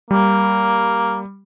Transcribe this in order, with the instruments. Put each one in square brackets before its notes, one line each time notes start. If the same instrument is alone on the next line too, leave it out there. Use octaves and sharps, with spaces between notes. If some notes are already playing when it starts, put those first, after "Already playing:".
[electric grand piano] G3 [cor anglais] A#3